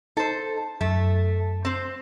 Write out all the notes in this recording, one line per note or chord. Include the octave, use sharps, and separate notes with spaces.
D#4 A4 C5
F#2 A3
C4 C5